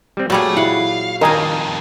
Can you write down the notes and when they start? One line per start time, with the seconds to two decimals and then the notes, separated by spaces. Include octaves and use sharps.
0.17 G3 C4
0.30 A#2 F#3 G3 A3 G#4 A4
0.57 E4 F5 F#5
1.21 F2 D#3 G3 A#4 D#5 F5 G#5